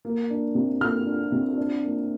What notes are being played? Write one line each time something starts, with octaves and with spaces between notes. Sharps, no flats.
A#3
D4
C3
A#3 F6
D4
C3
D4
A#3